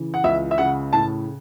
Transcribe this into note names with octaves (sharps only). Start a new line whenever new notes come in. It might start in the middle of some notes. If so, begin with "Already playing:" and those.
Already playing: C#3 E3
F#5
C#2 E5
E5
C#3 F#5
A2 A5